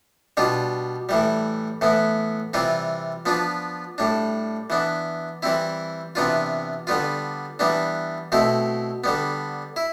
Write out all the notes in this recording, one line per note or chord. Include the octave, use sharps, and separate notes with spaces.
B2 G3 D4 F4
A2 E3 G3
A2 E3 B3
C3 E3 G3 C4 F4
F3 B3 D4 F4
A2 G3 D4
E3 B3 D4
E3 G3 C4 E4
C3 E3 B3 D4 F4
D3 G3 B3 F4
E3 G3 B3 D4
B2 A3 C4 E4
D3 G3 B3
E4